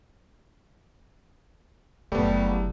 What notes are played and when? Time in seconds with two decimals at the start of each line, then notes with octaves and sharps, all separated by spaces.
2.12 F#1 B2 G3 A3 B3